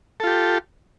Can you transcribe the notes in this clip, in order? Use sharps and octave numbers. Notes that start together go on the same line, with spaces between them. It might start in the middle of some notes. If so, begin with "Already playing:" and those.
F4 G4 A4